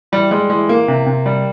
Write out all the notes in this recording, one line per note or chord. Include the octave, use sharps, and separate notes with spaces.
E3 G3
G3 G#3
E3 G#3
E3 A#3
C3
C3
G3